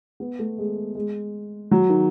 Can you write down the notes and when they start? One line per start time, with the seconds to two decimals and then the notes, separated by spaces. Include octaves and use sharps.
0.20 B3
0.39 A3
0.58 G#3
0.95 G#3
1.71 F#3
1.89 D#3